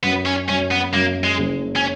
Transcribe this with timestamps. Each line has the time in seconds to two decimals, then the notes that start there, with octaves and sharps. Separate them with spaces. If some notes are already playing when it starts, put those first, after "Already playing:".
0.03 F#2 B3
0.26 C#4
0.49 F#2 C#4
0.71 B3
0.93 F#2 A#3
1.24 G#3
1.39 F#1
1.76 C#4